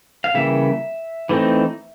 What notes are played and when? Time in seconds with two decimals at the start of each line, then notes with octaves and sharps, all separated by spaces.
0.24 F5
0.34 C#3 E3 G3 A#3 E5
1.29 E3 A3 C4 D#4